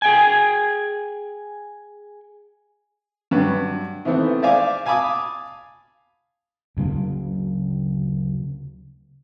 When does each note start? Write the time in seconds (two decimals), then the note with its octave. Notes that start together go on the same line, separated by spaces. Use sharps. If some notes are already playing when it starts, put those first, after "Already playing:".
0.02 G#4 G5 G#5
3.31 G2 F#3 F#4 B4
4.05 D#3 E3 A3 B3 C4
4.42 C5 D5 E5 F5 G#5 D6
4.86 F5 G#5 A5 B5 D6 D#6
6.77 D2 C#3 F#3 A#3